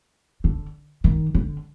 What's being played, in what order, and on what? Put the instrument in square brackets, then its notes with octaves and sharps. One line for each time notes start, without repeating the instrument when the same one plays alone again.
[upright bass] D3
D#3
D3